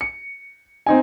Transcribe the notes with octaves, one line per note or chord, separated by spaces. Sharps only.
C#7
C4 D#4 G#5